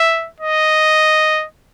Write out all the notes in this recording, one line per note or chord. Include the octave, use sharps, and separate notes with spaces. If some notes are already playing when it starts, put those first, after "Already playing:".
Already playing: E5
D#5